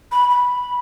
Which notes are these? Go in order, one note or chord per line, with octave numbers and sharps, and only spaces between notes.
B5
B5